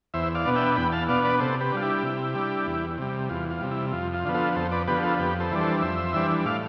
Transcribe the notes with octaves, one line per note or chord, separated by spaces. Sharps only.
E2 C5 E5
D5 F5
B2 B3 D4
E5 G5
E2 G5 B5
F5 A5
B2 B3 D4 D5 F5
B4 D5
C3 A4 C5
G4 B4
G3 D4 F4
E4 G4
C3
G3 D4
E2
C3 G3
E2 F4
F4
C3 G3
E4
F2 F4
F4
D3 F3 B3
F4 A4
F2 A4 C5
B4 D5
D3 F3 B3 G4 B4
G4
F4 A4
F2 G4 B4
A4 C5
E3 G3 D4
A4 C5
F2 C5 E5
E3 G3 D4
A2 D5 F5